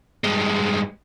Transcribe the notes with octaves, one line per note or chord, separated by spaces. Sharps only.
G2 G#3